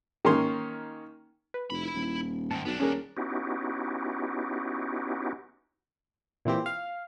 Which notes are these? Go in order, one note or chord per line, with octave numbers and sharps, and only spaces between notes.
D#3 A#3 C#4 C6
B4
F1 E4 B5
D#1
G#2 D#3 A5
B1 B3 D4
D#1 C#4 G#4 A#4
B3 C#4 D#4 E4 F#4 G4
A#2 E3 C4 G4
F5